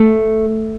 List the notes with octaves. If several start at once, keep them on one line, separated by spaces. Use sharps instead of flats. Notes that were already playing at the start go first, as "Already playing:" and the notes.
Already playing: A3